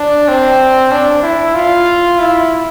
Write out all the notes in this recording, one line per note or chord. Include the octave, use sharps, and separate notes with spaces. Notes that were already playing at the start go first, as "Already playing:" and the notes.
Already playing: D4
C4
D4
E4
F4
E4